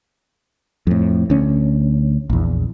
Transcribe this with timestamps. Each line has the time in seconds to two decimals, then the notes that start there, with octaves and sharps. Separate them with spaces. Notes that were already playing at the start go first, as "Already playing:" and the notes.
0.87 F2 A2
1.30 D2 C#4
2.30 A#1 E2